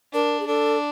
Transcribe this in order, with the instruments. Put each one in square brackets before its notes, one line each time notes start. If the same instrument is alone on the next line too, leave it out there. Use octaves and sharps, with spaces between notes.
[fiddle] D4 [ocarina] A#4
[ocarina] G#4
[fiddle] D4 [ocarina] A4